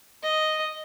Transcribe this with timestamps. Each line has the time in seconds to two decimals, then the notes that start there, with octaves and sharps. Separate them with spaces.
0.23 D#5